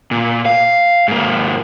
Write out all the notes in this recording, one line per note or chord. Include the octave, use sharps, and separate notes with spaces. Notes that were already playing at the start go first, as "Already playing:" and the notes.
A#2
F5
G#2 A#3